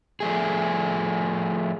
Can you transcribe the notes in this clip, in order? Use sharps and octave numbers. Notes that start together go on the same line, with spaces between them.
F3 A3 G#4